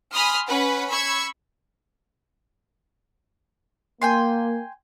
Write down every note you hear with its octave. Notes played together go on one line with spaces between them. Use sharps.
G#5 B5 C6 D#6 F6
C#4 B4 F#5 B5
B5 C#6 E6 G#6
A#3 G5 G#5 C6